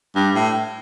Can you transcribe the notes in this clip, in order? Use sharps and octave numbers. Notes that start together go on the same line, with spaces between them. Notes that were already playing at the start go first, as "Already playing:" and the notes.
G2
A2